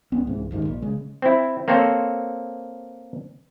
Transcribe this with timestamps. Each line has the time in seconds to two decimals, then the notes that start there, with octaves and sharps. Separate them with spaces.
0.12 C#2 B3 C#4
0.27 C2 G#2 E3
0.51 F#1 D#2 G#2 D#3
0.65 A#1
0.82 C#3 G#3
1.22 C4 E4
1.68 A#3 C4 A4 C5 C#5